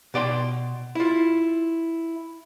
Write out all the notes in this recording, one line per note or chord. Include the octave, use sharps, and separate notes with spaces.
B2 D5 G5 C6
E4 F4